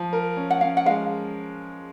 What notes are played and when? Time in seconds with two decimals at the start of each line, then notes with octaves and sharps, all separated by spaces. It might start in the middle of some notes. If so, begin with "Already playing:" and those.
Already playing: F3
0.13 A#4
0.37 C#4
0.50 F#5
0.61 C#4 F5
0.77 F#5
0.86 G#3 F5